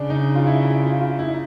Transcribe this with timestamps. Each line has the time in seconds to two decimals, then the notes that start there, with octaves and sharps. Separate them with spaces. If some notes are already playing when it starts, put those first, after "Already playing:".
Already playing: C#3 D4
0.10 D#4
0.35 F4
0.47 E4
0.65 E4
0.83 F4
1.01 F4
1.19 E4
1.29 D#4